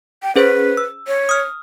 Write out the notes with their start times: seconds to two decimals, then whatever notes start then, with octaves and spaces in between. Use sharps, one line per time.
0.23 G5
0.36 C#4 G#4 B4 C5
0.77 E6
1.07 C#5
1.29 D#6 F6